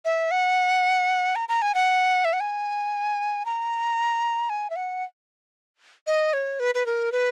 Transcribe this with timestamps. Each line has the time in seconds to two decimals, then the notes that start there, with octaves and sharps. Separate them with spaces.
0.05 E5
0.31 F#5
1.36 A#5
1.49 A#5
1.62 G#5
1.75 F#5
2.25 E5
2.33 F#5
2.40 G#5
3.46 A#5
4.50 G#5
4.70 E5
4.76 F#5
6.07 D#5
6.33 C#5
6.60 B4
6.75 B4
6.86 A#4
7.12 B4